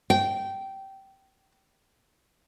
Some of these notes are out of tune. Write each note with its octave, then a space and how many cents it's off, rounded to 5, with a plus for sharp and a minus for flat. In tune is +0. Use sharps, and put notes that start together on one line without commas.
G5 -15